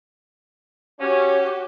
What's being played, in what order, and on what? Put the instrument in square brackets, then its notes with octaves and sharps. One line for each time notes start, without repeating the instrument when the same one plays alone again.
[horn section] C#4 [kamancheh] F#4 G4